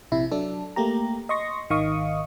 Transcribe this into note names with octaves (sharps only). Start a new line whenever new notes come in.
A#1 C3 E4
F#3 D4 A4
A3 A#3 G4 A#5
D#5 C6 C#6 A#6
G#1 D#3 D#5 F5 C#6 D#6